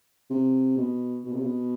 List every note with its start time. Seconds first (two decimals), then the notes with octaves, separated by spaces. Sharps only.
0.30 C3
0.77 B2
1.24 B2
1.33 C3
1.42 B2